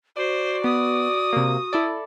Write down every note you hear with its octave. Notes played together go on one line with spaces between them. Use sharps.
F#4 C5 D5
B3 D#6
C3 A#3
E4 A4 D5